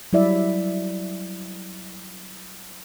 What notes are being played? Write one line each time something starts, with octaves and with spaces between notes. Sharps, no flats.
F#3 G3 E4 D5 E5